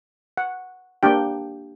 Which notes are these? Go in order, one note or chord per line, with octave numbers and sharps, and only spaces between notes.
F#5
A#3 D4 G4 G5